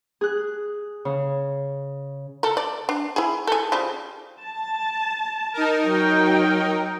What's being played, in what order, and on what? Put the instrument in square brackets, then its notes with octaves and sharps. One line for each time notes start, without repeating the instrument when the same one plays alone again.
[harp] G#4 F#6
C#3
[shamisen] A4 A#4
D5
D4
E4 G#4
G#4 A4
C#3 F3 G3
[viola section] A5
[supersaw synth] D#4 A#4
[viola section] F#3 G5